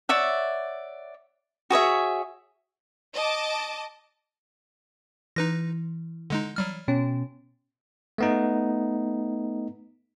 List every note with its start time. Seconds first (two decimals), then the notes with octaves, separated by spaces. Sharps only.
0.09 C#5 D5 E5 F#5
1.70 F#4 G#4 C#5 E5
3.13 D#5 A5 D6
5.36 E3 D#4 B4 A#6
6.30 D3 G#3 D#4
6.56 F#3 G3 F6
6.88 B2 C#4
8.18 A3 B3 D#4